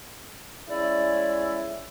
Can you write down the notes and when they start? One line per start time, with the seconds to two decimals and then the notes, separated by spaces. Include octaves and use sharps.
0.69 G#3 C#4 E4 D5